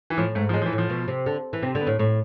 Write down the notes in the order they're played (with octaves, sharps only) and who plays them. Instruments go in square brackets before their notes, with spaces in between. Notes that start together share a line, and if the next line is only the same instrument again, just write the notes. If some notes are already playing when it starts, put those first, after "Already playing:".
[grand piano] E3
[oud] A2 [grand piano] F3
[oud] G#2 [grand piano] A3
[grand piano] F3
[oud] A2 [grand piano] G#3
[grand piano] F3
E3
[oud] A2
[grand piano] F3
[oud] B2
C3
D3
E3
[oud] C3 [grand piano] C4
[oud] D3
[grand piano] B3
[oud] A2
[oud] A2 [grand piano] A3